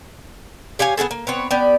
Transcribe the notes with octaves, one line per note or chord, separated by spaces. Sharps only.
G4 C#5 F5 G#5
B3 F4 G#4 A4
A#3
B3 C4 C#5
B3 G4 D5